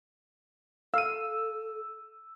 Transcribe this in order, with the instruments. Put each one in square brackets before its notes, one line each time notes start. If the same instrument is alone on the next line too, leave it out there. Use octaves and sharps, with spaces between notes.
[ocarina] A4 [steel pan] F5 [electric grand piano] E6 D#7